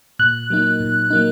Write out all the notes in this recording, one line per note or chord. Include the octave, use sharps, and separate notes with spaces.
A#2 F#6
F#3 A#3 D#4
A#2
F#3 A#3 D#4